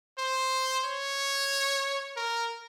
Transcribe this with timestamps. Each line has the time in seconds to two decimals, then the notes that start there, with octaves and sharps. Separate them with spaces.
0.18 C5
0.84 C#5
2.17 A#4